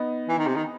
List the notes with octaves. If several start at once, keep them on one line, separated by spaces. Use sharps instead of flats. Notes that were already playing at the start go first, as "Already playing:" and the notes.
Already playing: B3 D#4
E3
D#3
C3
D#3